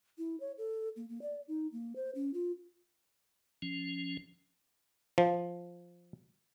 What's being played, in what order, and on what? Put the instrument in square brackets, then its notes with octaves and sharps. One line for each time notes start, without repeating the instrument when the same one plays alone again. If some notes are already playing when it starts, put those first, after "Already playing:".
[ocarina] E4
C#5
A4
A#3
A#3
D5
D#4
A#3
C5
C#4
F4
[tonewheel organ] F3 C#4
[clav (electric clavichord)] F3